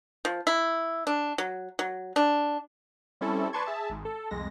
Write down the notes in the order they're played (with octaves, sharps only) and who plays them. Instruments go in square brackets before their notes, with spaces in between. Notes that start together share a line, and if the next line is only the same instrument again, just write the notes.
[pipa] F3
E4
D4
F#3
F#3
D4
[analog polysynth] G3 C4 C#4 E4 A4
B4 D5 A5 C6 C#6 G#6
G#4 E5 A5
G#1 G#2
A4
C2 F2 G#3 A#6